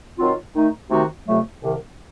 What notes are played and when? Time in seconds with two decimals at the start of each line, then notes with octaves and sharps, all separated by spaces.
0.18 D#3 F#3 C4 F4
0.54 D#3 A3 D#4
0.91 C3 D#3 A3 D#4 F#4
1.27 F2 C3 F#3 A3
1.63 C2 C3 D#3